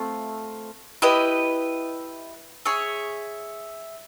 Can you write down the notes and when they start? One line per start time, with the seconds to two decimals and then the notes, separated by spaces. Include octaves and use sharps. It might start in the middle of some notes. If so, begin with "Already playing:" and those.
Already playing: A3 C4 F4
1.02 E4 G4 B4 D#5
2.65 G#4 C#5 E5